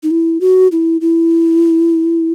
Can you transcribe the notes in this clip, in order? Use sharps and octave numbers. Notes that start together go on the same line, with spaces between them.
D#4
E4
F#4
E4
E4